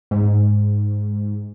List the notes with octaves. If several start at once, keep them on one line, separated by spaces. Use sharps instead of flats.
G#2